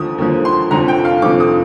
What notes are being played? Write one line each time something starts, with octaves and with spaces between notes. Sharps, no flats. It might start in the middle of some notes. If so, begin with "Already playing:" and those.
Already playing: D#2 D3 F3 D#6
D#2 D3 F3
C6
F1 F2 D3 F3 A#5
G5
F5
F1 F2 D3 F3 D6
D#6